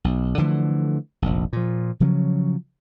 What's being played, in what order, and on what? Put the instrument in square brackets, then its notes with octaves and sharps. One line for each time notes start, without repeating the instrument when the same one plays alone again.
[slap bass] B1
D3 E3 F3 A3
F1 A#1
A#2 F3
C#3 F3 F#3 C#4